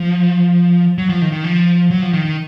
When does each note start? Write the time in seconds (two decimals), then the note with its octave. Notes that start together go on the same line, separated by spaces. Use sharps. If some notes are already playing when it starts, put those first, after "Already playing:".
Already playing: F3
0.98 F#3
1.09 F3
1.22 D#3
1.32 D#3
1.44 F3
1.91 F#3
2.02 F3
2.13 D#3
2.25 D#3